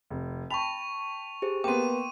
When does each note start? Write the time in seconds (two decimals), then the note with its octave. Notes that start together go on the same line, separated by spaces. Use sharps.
0.10 F1
0.51 G5 A5 B5 C#6 F7
1.42 G4 G#4 C5
1.64 A#3 B3 G5 C6 D6 D#7